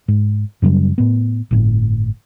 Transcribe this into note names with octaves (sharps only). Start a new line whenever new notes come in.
G#2
F#2 C#3 F#3 G3
A2 B3
G1 A2